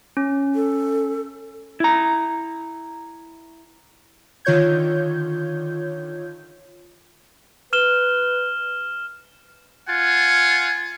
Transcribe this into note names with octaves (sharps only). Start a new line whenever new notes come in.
C#4
A4
E4 A#5
D3 D#3 F4 C#5 G6 G#6
B4 F6 E7 G7
F4 F#5 G#5